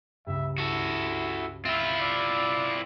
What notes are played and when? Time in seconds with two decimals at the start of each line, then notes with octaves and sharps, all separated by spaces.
0.27 C#2 G2 E5
0.58 E4 F#4 A4
1.65 C4 E4 F4 E5
2.00 D5 D7